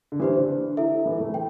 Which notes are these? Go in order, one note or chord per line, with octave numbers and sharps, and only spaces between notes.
D3
E3 D4 G4 C5
D3
E4 A4 E5
E3
E3 A3
G5